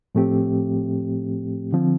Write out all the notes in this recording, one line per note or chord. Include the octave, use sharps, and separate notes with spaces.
A2 F3 A3 C4 G4
D3 F3 C4